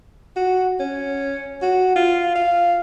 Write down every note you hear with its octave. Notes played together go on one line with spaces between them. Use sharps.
F#4
C#4
F#4
F4
F5